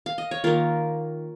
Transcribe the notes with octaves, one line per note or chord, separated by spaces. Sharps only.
F5
D#5
C#5
D#3 A#3 F4 A#4